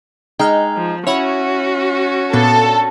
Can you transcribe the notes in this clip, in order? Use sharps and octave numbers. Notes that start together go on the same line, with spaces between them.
G#3 D#4 G5 F6
F3
C#4 E4 F#4 C#5 F#5 B5
A#2 B3 D4 A4